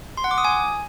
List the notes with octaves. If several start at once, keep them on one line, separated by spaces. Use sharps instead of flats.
C6
F#5
D6
D#6
G#5